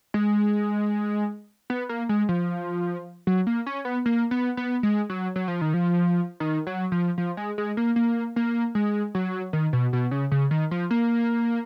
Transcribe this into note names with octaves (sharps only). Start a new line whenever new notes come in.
G#3
B3
A#3
G#3
F3
F#3
A#3
C#4
B3
A#3
B3
B3
G#3
F#3
F#3
F3
D#3
F3
D#3
F#3
F3
F3
G#3
G#3
A#3
A#3
A#3
G#3
F#3
D#3
B2
B2
C#3
C#3
D#3
F3
A#3